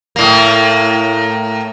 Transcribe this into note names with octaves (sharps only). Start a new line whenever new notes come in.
A2 A#3